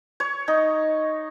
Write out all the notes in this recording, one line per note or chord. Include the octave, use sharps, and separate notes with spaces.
C#5
D#4